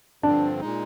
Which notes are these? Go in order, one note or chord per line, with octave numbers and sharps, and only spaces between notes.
G2 D3 F3 C4 D4
A#2 G#3 D#4